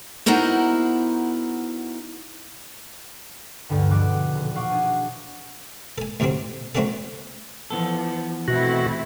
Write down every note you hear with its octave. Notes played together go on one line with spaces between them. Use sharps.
B3 D#4 E4 F#4 A#4 C5
D2 G2 D3
E1 B2 F3 D6 F#6
D#1
F5 F#5 C#6 D6
D4 G#4
A4 G#5
D2 A2 C3 F#3 C4
F#3 A3 C4 C#4 F#4 A4
E3 F3 B3 A4
B2 A3 C4 E4 F#4